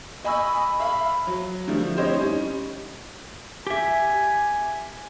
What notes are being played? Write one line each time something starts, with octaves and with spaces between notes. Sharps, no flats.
D#5 G#5 B5 C#6 E6
E5 F5 B5
F#3
D3 F3 G3 A3 E4
C4 E4 G4 C5 C#5 D#5
G3 C#4 D#4
G4 E5 G#5